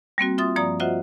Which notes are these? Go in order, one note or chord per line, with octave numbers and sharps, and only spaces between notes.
G3 A#3 C4 F#4
F4 E5 C6 D#6 A6
G2 F3 A#3 D5 A#5 D#6
F4 F#4 C5 D#5 E5 F#5